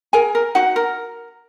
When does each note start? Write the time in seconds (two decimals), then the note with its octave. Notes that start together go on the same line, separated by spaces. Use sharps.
0.13 G#4 A#4 G#5
0.35 A#4
0.55 D#4 F#4 F#5
0.76 A#4